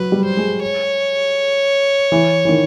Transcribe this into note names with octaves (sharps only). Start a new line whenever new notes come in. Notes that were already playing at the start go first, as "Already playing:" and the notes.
Already playing: F#3 B4
G3
C5
G#3
C#5
E3
E3
D#3